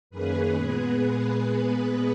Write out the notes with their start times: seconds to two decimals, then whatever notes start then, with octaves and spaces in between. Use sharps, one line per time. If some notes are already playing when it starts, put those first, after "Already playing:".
0.10 F#2 D#3 A#3 C#4 G#4 B4
0.55 A#2 G#3 B3 G#4 B4